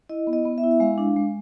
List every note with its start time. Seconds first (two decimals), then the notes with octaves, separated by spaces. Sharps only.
0.09 E4 D#5
0.27 B3
0.33 D#5
0.45 B3
0.58 E5
0.64 E4
0.71 E5
0.80 G#3 F5
0.98 D4
1.17 G#3